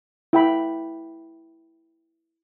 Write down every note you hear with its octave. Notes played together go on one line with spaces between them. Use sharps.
E4 G5 B5